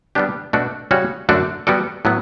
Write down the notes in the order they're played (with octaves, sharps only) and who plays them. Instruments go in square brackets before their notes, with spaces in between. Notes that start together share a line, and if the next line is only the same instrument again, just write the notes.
[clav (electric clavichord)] G3 B3 D4 G4
B2 A3 D4 F#4
C#3 G3 C#4 F#4 C#5
F#2 D3 A3 D4 F#4
G3 B3 F#4 A4 D5
A2 F#3 B3